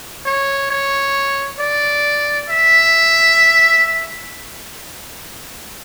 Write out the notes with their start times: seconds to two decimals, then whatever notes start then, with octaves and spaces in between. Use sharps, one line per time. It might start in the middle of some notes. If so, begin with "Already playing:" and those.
0.25 C#5
0.70 C#5
1.59 D5
2.49 E5